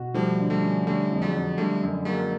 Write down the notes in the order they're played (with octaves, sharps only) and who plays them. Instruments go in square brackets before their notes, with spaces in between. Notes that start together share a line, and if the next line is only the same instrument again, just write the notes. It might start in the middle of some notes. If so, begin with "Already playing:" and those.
Already playing: [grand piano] B2 F#4
[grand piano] F3 [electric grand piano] G3 A3
[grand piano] D3
[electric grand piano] G3 A3
[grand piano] C#4
[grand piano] D3 [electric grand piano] G3 A3
[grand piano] F2
[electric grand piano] F#3 G#3
[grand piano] F2
[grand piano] D3 [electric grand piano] G3 A3
[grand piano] F#2
[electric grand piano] F#3 G#3 [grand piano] A#3